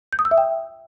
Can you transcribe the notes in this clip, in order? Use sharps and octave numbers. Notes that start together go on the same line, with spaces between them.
G6
D#6
E6
E5
G5